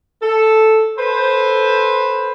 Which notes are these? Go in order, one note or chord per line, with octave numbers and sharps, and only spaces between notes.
A4
A4 B4 C5